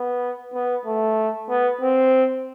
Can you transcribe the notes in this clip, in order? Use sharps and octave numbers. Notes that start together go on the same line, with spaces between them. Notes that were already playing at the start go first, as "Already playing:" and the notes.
Already playing: B3
B3
A3
B3
C4